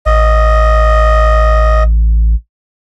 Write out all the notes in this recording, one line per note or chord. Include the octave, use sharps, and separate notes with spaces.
A1 D#5